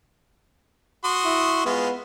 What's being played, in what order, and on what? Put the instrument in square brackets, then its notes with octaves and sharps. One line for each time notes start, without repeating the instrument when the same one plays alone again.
[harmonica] F#4 C6 D#6
[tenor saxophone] E4
[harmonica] G#3 F4 [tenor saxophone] B3